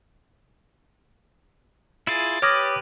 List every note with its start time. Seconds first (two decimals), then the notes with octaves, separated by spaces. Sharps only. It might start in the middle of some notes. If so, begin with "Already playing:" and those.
2.07 E4 F4 G#4 A6
2.42 G4 B4 C#5 D6 D#6 F6 G#6 A#6